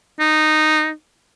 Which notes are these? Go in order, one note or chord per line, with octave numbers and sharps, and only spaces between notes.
D#4